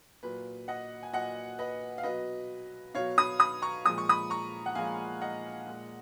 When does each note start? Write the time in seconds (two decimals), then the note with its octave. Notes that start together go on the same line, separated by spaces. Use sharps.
0.23 A#2 F#3 B4
0.68 D#5 F#5
1.03 G#5
1.13 A#2 F#3 D#5 F#5
1.58 B4 D#5
1.98 F5
2.03 B2 F#3 B4 D#5
2.94 B2 F#3 C#5 F5
3.18 B5 D#6
3.39 B5 D#6
3.62 A#5 C#6
3.85 A#2 F3 G#3 D#6
3.98 C#6
4.09 B5 D#6
4.30 A#5 C#6
4.66 F#5
4.75 A#2 F3 G#3 F5 G#5
5.21 D#5 F#5
5.67 A#2 G#3